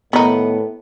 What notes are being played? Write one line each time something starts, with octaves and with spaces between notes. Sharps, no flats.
A2 D#3 B3 D#4